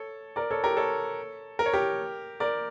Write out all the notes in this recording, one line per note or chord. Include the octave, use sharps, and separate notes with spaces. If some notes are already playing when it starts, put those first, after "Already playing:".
Already playing: A4 C#5
A#4 D5
A4 C#5
G4 A#4
A4 C#5
A#4
C#5
G4 A#4
A#4 D5